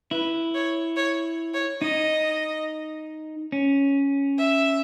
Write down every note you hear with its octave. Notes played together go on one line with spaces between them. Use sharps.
E4 B4
C#5
C#5
C#5
D#4 D#5
C#4
E5